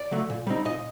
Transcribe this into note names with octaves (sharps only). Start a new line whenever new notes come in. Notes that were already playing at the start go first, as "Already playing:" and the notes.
Already playing: D5
D3 F#3 A3
A#2
G3 C4 D#4
A#2 D#5